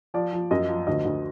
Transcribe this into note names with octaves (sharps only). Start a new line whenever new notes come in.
F3 D5
F3
F#2 D#5
F3
D2 D#5
D2